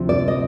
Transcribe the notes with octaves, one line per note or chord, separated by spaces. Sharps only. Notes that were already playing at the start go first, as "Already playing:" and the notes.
Already playing: D2 C3 F3
D5
D#5